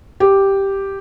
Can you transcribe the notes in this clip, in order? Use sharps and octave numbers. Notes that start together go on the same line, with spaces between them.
G4